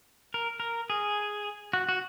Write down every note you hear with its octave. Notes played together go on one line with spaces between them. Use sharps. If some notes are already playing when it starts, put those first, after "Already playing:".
A#4
A#4
G#4
F#4
F#4